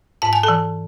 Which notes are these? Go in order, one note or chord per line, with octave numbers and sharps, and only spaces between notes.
G#2 A5
G#5
A4 A5
E3